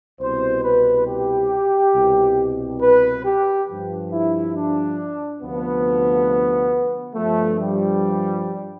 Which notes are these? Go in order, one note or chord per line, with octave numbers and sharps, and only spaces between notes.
C2 B2 C5
B4
G4
C2 B2
B4
G4
G2 F3
E4
D4
D2 C3 F3 B3
G2 F3 A3
G3